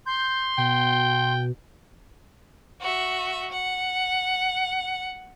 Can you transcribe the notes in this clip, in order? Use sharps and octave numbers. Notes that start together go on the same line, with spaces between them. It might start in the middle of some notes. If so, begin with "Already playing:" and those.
C6 G6
B2 G5
F#4 E5
F#5